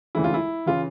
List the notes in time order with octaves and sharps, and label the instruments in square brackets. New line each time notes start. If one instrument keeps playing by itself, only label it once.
[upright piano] E1 D2 C#3 E3 E4
F4
E4
C#3 E3 F4